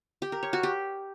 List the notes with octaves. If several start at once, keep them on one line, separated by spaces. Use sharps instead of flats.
G4
A#4
C#5
F#4
G4